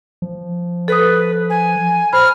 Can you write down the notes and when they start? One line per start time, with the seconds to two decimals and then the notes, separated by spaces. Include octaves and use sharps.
0.22 F3
0.88 A4 B4 D#6
1.50 G#5
2.13 C5 B5 F6